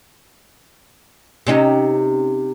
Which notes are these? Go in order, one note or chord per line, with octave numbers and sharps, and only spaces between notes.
C3 C#4 D#4